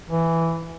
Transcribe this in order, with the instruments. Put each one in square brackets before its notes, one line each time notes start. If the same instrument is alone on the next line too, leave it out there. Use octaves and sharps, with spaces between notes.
[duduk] E3